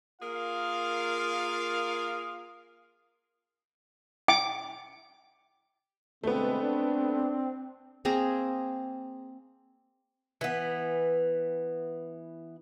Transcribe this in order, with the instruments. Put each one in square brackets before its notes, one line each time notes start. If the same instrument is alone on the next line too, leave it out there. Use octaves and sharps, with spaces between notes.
[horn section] A#3 F4 G#4 A#4 F5
[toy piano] G5 [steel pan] D6
[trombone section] B2 D3 G#3 [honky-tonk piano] A3 B3 [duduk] C4
[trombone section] D4
[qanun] A#3 C4 G#4 A#5
[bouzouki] E3 B3